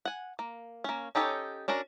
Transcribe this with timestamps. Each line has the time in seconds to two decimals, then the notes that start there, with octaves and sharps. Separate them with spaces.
0.05 F#5 G#5
0.39 A#3
0.84 A#3 C#4
1.15 C#4 D#4 G4 A4 C#5
1.68 C#4 D4 F#4 A#4